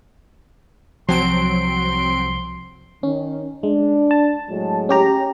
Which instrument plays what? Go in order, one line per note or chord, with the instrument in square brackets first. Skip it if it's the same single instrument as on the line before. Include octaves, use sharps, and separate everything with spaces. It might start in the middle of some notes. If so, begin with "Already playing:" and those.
[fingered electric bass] C2 [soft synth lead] F3 [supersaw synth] F#3 C4 D7 [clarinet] C6
[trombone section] D#3 [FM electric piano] C#4
[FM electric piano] G#3 [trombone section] D4
[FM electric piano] A5
[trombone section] A2 F#3 G#3
[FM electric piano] C#4 G4 A#5